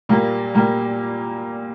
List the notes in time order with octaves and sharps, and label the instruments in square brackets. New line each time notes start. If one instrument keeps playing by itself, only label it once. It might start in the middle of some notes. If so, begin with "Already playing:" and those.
[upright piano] A#2 G3 A#3
A#2 G3 A#3